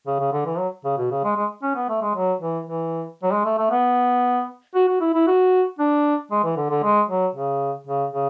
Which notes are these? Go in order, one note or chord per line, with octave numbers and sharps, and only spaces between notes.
C#3
C#3
D3
E3
F#3
C#3
B2
C#3
G#3
G#3
C#4
B3
A3
G#3
F#3
E3
E3
F#3
G#3
A3
A3
B3
F#4
F#4
E4
E4
F#4
D4
G#3
E3
D3
D3
G#3
F#3
C#3
C#3
C#3